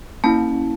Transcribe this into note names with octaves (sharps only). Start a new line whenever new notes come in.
A#3 C#4 E4 A5